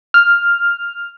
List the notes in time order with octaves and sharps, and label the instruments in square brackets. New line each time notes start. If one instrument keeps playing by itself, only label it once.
[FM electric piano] F6